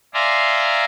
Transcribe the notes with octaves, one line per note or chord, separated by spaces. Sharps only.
D5 E5 F5 G#5 A#5 C6